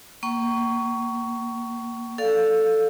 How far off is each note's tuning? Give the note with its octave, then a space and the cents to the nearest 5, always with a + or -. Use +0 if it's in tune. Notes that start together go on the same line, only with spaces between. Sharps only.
A#3 +0 G5 -45 C#6 +15
A4 +0 D5 +0 F5 +0